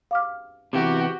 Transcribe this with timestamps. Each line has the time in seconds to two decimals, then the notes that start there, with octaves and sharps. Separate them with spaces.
0.11 F5 D6 F6
0.73 C3 E3 B3 F#4 G4